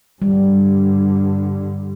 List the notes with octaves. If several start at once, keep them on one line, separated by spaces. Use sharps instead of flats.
G2 D3 G3